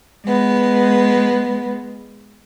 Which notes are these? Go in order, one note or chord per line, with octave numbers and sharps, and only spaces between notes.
G#3 B3